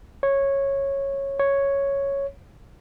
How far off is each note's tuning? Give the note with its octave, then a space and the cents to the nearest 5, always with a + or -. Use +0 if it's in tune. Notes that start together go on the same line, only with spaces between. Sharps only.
C#5 -10
C#5 +0